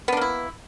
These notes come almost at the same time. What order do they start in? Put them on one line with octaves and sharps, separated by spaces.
B3 D4 A#3 E4